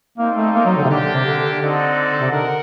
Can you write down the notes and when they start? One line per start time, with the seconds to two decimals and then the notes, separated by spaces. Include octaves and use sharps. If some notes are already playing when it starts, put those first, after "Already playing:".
0.18 G3 A#3 C4 D#4
0.36 A3
0.55 A#3
0.65 F#3
0.77 D3
0.84 C3
0.89 D3 A#3 D4 G4
1.01 D3
1.13 C3
1.25 D3
1.60 D3 C4 D#4 A4 D5 F#5
2.20 C3
2.30 D3 A#4 F#5